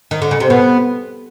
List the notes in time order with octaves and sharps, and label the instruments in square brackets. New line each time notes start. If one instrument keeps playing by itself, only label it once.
[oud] D#3
D3
C#3
C3
[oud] B2 [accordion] B3